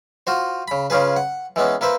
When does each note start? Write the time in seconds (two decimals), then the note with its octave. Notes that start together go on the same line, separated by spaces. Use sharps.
0.27 F4 F#4 C5
0.68 C#3 B5
0.90 C#3 C#4 F4 G#4 B4
1.16 F#5
1.56 E3 G#3 B3 C#4
1.81 A#3 E4 B4 C5